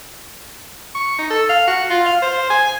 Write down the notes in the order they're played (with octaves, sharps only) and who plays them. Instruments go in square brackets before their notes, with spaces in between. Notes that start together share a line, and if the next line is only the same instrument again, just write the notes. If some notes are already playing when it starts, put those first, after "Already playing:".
[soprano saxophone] C#6
D#4
A4
F5
F#4
F4
F5
C5
G#5